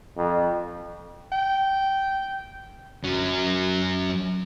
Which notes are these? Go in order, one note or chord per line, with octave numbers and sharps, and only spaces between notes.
F2
G5
F#2 F#3